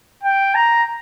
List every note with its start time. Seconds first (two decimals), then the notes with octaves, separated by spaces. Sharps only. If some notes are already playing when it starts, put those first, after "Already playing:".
0.23 G5
0.55 A#5